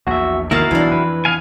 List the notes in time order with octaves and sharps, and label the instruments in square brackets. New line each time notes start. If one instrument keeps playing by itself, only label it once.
[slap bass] A#1 E2 A#2 [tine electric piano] F#4 E5
[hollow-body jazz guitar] D#3 A#3 [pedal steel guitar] E4 F#4 F5 [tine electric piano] A#5 F#6 A6
[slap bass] B1 [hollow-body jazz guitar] E3 D4
[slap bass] F2 [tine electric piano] B4
[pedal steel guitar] B3 F5 G#5